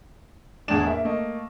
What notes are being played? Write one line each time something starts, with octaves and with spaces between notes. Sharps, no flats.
E2 A2 D4 G#4 E7
A#3 E5
A3 A#3 D#5